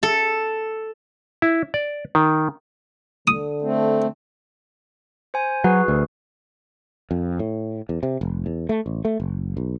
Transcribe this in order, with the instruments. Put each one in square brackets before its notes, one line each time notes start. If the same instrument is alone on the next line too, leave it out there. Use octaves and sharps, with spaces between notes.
[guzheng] A4
[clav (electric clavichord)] E4
D5
D#3
[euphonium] D3 [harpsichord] D#6
[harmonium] A3 C4
[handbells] C5 G#5
[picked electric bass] F#3 [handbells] F#4 G#4 B4
[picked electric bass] D2
[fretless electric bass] F2
A2
E2
C3
F1
E2
A3
A1
A3
F#1
B1